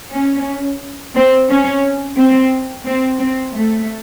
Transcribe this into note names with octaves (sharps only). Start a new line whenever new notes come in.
C#4
C4
C#4
C4
C4
C4
A3